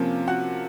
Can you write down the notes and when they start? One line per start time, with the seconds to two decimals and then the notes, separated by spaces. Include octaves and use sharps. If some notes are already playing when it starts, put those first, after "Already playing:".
Already playing: C3 F3 A#3 C#4
0.28 F#4 F#5